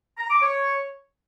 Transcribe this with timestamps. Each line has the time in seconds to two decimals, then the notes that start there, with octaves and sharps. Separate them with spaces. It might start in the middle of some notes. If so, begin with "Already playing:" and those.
0.18 A#5
0.30 D6
0.41 C#5